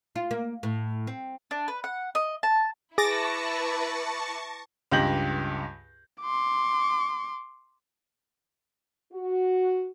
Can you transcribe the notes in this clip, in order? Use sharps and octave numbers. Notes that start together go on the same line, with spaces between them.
F4
A#3
A2
C4
D4
B4
F#5
D#5
A5
E4 G#4 B4 A5 C#6 D6 A6 A#6
C#2 G2 G4 G6 A#6 F#7
C6 D6
F#4